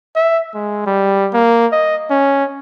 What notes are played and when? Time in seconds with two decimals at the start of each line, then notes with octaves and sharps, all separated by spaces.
0.16 E5
0.54 G#3
0.86 G3
1.33 A#3
1.72 D#5
2.10 C#4